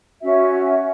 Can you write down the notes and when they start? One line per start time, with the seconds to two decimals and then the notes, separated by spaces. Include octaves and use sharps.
0.22 C#4 F#4 E5